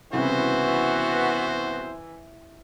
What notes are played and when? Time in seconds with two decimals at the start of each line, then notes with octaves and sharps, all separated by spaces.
0.13 C2 C#3 E3 B3 F#4 C5